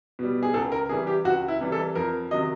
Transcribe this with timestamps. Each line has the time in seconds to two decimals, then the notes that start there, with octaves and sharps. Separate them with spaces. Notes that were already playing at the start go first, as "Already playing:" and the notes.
0.19 B2 G3
0.43 G#4
0.54 C#2 A4
0.72 A#4
0.89 C3 E3 G3 G#4
1.07 G4
1.25 C#2 F#4
1.48 E4
1.60 C3 E3 G3
1.72 A4
1.95 F2 A#4
2.31 C3 D#3 F#3 D#5